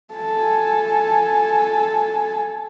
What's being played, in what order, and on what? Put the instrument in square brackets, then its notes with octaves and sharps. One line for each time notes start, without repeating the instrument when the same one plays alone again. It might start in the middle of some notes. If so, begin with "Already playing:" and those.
[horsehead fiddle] A4 G#5